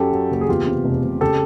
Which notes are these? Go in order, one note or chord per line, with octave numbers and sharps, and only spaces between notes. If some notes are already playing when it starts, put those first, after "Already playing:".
Already playing: F#2 F#3 G4 A4
F#3
F#1 A4
G#4
E2 F4 G4
C3
F1
F1
C#3 G4 A4